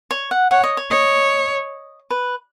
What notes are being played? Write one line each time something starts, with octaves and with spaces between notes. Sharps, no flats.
C#5
F#5
C#5 F#5
D#5
C#5
C#5 D#5
B4